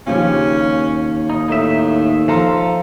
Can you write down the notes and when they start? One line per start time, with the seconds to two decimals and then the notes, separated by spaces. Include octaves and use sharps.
0.07 D#2 C#3 F3 C#4 G4
1.30 D#4
1.48 A2 D#4 E5
2.28 F3 A4 F5 A#5 C6